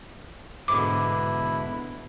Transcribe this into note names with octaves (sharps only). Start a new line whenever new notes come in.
G#2 B2 D3 E4 D6